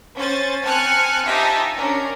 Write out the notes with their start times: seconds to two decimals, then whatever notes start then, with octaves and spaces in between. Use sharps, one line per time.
0.17 C#4 C5 G#5 A6
0.64 C4 G#5 A5 F6 F#6 C#7
1.26 D#4 F4 G4 E5 G#5 A5
1.76 C#4 D4 A#4